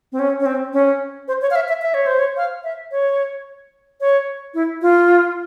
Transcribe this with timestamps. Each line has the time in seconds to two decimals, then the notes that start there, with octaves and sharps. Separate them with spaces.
0.12 C4
0.19 C#4
0.40 C#4
0.46 C4
0.73 C#4
1.28 C5
1.42 C#5
1.51 F5
1.55 E5
1.68 E5
1.82 E5
1.94 C#5
2.06 C5
2.19 C#5
2.37 F5
2.64 E5
2.91 C#5
4.01 C#5
4.54 E4
4.82 F4